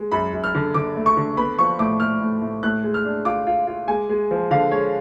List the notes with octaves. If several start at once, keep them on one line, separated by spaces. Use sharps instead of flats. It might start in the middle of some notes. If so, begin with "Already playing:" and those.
Already playing: G#3
F#2 B5
F#2
F6
D3
D3 D6
A3
C#6
D3
B3 B5
F3 C#6
A2 D6
A2 F6
A2
A2
A2 F#6
G#3
F6
D4
F4 D6
F4
F4
G#3 G#5
G#3
F3
D3 F5
G#3 C#5